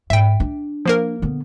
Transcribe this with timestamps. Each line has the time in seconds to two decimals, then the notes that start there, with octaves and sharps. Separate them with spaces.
0.10 G#2 E5 G5
0.40 D4
0.86 F3 A#3 A#4
1.22 D3 B3